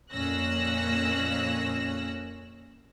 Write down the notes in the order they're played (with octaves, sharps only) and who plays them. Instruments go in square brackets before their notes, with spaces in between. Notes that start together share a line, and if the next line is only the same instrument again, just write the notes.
[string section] F2 A#2 C#4 E6 F#6 A#6